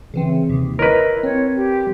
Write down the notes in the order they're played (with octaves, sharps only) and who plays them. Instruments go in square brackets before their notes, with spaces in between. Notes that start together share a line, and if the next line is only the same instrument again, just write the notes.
[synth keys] C#3 E3 C4
D#2 C3
[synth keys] E4 C#5 [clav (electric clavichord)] A#4 B4 [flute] D#5
[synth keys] C4 [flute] C#5
[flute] G4